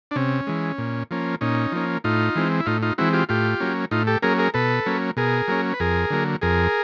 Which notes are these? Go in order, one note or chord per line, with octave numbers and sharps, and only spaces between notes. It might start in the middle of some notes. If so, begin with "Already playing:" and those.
D4
C3 C#4
E3 G#3
A#2
F3 A#3 C#4
A#2 C#4 D#4
F3 A#3 C#4
A2 D#4 F4
E3 G#3 C4
E4
A2 D#4 F4
D#4 F4
E3 G#3 C4 E4 F#4
F4 G4
A2 F4 G4
F#3 A#3 C#4
A2 D#4 F4
G4 A4
F#3 A#3 C#4 G#4 A#4
G#4 A#4
B2 A4 B4
F#3 A#3 C#4
B2 G#4 A#4
F#3 A#3 C#4
B4
F2 G#4 A#4
D3 F#3 A#3
F2 G#4 A#4